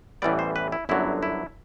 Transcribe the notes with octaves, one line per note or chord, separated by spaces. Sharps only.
A1 A2 E3 G3 B3 D5
C5
B4
E4
G1 F#2 D3 F#3 E4
E4